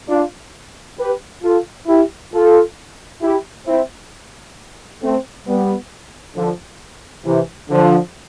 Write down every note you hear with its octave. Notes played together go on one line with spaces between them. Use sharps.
D4 F4
G4 B4
F4 A4
E4 G4
F4 A4
E4 G4
C4 E4
A3 C4
G3 B3
D3 F3
C3 E3
D3 F3